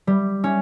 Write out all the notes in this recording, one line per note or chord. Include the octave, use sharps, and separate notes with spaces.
G3
C#4